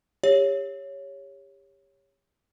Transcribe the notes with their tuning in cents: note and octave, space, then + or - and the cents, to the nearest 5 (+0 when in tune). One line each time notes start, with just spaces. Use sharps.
G4 +30 C#5 +0